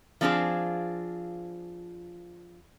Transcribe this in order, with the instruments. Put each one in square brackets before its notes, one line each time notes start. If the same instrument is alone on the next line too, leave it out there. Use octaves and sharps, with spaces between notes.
[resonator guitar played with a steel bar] F3 C4 D4 F4 G#4